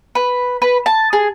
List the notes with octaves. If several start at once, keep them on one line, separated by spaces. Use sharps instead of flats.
B4
B4
A5
G#4